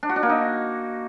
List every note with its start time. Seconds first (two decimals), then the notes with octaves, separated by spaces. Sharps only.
0.03 D4
0.09 F#4
0.16 D4
0.23 A#3
0.29 D#4